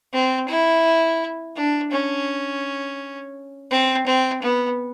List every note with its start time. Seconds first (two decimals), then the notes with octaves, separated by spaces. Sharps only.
0.13 C4
0.49 E4
1.56 D4
1.92 C#4
3.71 C4
4.06 C4
4.42 B3